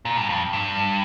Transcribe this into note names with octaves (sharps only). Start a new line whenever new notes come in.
A#2
G2
F2
G2